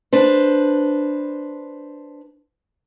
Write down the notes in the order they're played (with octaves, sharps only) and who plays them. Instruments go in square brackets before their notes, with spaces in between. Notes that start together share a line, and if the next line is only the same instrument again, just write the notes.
[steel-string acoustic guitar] D4 B4 C5